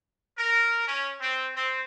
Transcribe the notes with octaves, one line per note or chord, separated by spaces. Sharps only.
A#4
C#4
C4
C4